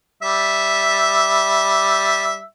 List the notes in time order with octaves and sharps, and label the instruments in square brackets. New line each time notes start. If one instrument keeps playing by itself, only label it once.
[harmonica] G3 E5